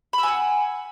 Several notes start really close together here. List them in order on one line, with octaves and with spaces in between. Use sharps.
B5 E6 G#5 F#5